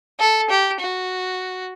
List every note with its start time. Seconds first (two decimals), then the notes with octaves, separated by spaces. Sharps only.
0.20 A4
0.50 G4
0.80 F#4